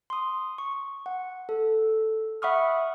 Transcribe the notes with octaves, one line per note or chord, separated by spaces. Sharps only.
C6 D#6
C#6
F#5
A4
E5 F#5 B5 C#6 D#6 F6